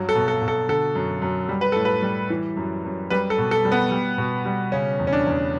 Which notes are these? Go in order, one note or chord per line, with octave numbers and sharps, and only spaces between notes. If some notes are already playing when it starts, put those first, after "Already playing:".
Already playing: G2 F#3
A4
B2
A4
B2
A4
D3 A4
F#2
F#2
G3
B4
A2 A4
B4
G3
E3
F#2
F#2
G3 B4
A4
B2
A4
G3
B3
G3
B2
G3
C#3 C#4
E2
C#4
D4
E2